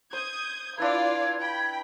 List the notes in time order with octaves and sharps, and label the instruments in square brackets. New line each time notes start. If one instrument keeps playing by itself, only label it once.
[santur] C5 [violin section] D#6 G6 G#6
[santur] D4 E4 B4 [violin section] F4 D5 [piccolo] G#6
[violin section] G5 B5